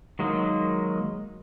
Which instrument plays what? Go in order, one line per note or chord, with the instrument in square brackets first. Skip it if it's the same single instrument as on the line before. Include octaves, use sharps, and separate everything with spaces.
[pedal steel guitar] D#3 F#3 G#3 A#3 D#4